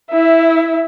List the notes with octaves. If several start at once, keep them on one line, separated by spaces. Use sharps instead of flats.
E4 E5